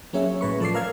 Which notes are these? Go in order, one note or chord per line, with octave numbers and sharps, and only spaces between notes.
F#3 A#3 C#4 G#4 C#5 E5
A2 B4 C#6
F3 A4 D5 C7
A#4 F5 E6 G#6